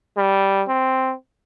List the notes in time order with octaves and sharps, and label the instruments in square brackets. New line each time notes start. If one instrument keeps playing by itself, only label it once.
[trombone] G3
C4